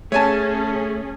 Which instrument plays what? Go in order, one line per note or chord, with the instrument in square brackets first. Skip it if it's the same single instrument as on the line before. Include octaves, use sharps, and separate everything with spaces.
[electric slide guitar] A3 [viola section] C#4 G#4 [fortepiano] C#5 G#5 A5